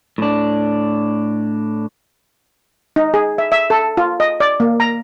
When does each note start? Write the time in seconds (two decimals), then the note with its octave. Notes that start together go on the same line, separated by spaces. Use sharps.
0.18 A2 D4
2.96 D#4
3.14 G#4
3.38 E5
3.52 E5
3.70 A4
3.97 F4
4.20 D#5
4.40 D5
4.60 A#3
4.80 A#5